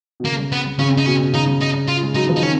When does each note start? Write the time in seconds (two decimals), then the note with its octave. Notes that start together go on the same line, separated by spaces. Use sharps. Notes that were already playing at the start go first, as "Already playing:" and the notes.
0.20 B2
0.25 C#3 A#3
0.52 B3
0.79 C#3 C#4
0.98 D#4
1.06 B2 C#4
1.33 C#3 D#4
1.61 D#4
1.88 F4
2.03 G#3
2.14 F#3 D#4
2.29 F3
2.36 D#4
2.42 D#3 C#4